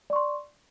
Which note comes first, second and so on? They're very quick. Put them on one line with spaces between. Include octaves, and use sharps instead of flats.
D5 C#6 C6